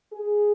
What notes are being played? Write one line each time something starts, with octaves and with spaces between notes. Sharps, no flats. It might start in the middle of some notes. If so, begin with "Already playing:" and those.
G#4